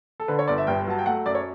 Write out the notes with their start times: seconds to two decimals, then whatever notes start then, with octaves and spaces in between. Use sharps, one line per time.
0.20 A4
0.28 D3 B4
0.39 C#5
0.48 G1 D5
0.58 E5
0.67 G2 G5
0.88 F#3 A5
0.99 G5
1.06 A3 F#5
1.26 F#2 D5
1.35 C#5